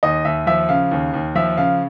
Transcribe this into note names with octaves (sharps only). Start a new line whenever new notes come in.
D#2 D#5
D#2 E5
F3 E5
C#3 F5
D#2
D#2
F3 E5
C#3 F5